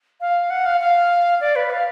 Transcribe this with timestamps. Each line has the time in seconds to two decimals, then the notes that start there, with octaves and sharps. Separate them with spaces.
0.21 F5
0.50 F#5
0.66 F5
0.80 F5
1.41 D5
1.56 B4
1.70 F5